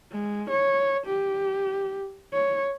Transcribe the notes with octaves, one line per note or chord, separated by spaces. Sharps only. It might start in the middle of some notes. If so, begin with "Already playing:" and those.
G#3
C#5
G4
C#5